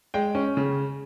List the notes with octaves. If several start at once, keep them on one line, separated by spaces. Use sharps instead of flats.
G#3 G5
C#4
C#3